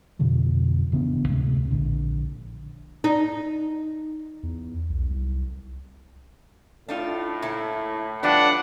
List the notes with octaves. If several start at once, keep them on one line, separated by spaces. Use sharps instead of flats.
F2 B2 D3 F3
A1 C#3 B3 D4
D2 A2 C3 G#3
A#1 D3
D#4
E2
B1
C2
A2 D4 D#4 F4
A#2 E4
F3 G3 B3 D4 F#5